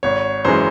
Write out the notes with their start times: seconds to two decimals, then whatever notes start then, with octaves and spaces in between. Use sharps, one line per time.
0.03 G#1 C#5
0.45 F#2 E3 G#3 C5